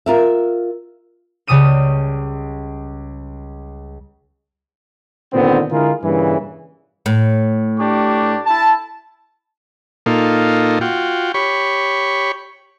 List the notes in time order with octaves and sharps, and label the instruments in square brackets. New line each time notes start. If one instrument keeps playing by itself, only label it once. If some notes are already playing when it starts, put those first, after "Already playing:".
[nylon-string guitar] F4 A#4 E5
[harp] C#2 C#3 G3 D#6 D#7 E7
[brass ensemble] A#2 D3 D#3 B3 C4
D3 G#3 E4 F4 G#4 A#4
G2 A#2 C#3 E3
[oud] A2
[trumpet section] D4 G4 C#6
E4 A5
[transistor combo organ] A#2 A#3 D#4 F4 A4
F4 F#4 G5
G4 C#5 B5 C#6